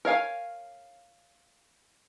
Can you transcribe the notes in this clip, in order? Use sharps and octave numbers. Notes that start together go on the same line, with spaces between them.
A#4 C#5 F5 G#5